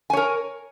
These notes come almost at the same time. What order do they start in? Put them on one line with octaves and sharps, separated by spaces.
G#5 C#5 A#4